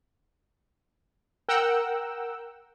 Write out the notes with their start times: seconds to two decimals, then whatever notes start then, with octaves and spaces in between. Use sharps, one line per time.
1.49 A#4 F#5 G5 E6